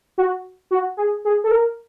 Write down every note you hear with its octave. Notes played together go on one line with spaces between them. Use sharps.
F#4
F#4
G#4
G#4
A4
A#4